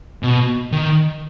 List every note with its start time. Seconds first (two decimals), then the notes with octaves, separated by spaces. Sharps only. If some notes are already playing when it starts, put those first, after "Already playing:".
0.23 B2
0.72 D#3